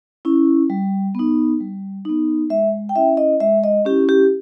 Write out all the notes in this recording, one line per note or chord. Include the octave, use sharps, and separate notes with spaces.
C#4 E4
G3
B3 D#4
G3
B3 D#4
G#3 E5
G5
C#4 E4 E5
D#5
G#3 E5
D#5
C#4 E4 G4
G4